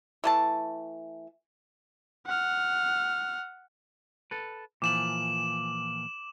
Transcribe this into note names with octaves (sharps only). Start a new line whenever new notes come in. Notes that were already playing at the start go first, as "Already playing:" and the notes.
E3 A3 A5
F#5 F6
A4 B4
A#2 E3 F3 D6 E7 F#7